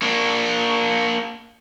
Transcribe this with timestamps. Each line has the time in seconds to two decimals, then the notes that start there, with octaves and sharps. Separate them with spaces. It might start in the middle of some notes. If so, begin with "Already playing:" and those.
0.02 A#3 D4